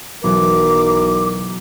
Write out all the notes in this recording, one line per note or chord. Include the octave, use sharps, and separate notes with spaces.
B1 B2 E3 F#3 A#4 D6